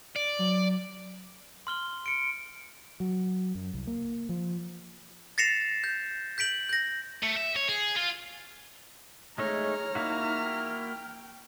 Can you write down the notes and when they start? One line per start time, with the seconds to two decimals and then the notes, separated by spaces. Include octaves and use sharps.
0.16 D5
0.39 F#3
1.67 C6 F6 G7
2.06 C#7 D7
3.00 F#3
3.55 F#2
3.74 C2
3.87 A#3
4.29 F3
5.38 A6 A#6 C7 C#7 E7 F7
5.84 G6
6.38 G6 B6 D7 F#7
6.69 G6 A#6
7.23 A3
7.36 E5
7.56 C#5
7.69 G#4
7.96 F4
9.38 G#3 A3 D#4 G#4 C#5 A#5 F6
9.95 A#3 D#4 E4 F#4
10.41 G5